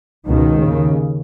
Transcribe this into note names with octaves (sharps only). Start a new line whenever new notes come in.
C#2 B2 D#3
D#2 C#3